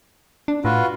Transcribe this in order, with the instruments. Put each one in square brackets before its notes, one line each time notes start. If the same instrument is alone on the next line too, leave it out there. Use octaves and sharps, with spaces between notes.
[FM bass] D4
[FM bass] A2 [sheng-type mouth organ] F4 F#4 B4